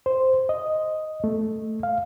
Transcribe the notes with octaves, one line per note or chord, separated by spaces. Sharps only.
C5
D#5
A3
F5